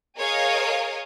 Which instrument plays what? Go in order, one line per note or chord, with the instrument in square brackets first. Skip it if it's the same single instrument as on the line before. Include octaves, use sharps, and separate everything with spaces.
[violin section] G#4 A#4 C#5 D#5 F5